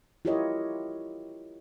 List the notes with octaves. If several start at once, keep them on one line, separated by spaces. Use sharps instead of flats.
E4 F4 G4 A#4 C#5 D#5